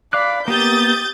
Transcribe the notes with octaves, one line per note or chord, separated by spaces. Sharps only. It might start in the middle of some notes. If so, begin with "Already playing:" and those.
D5 F5 B5 D6 F#6
A#3 B3 G4 D#6 G6 A6